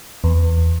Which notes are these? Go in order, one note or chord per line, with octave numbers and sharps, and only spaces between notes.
E2